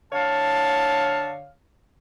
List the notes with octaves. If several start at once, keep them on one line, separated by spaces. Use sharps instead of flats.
D3 C#5 F5 A5